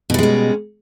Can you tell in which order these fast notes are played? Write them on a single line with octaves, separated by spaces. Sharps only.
B2 G3 G#3 C#4